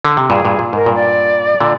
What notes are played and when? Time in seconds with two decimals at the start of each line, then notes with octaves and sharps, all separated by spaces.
0.05 D3
0.17 C3
0.30 G2 A#2 G#4
0.45 G2 A#2
0.59 A#2
0.73 G#2 A#4
0.86 G2 A#2
0.95 D5
1.60 A#2 D3